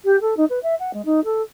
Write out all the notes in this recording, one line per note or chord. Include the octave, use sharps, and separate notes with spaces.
G4
A4
D#4
B4
E5
F#5
G#3
D#4
A4